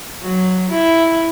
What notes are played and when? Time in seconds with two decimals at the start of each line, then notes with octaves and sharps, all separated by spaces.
0.22 F#3
0.70 E4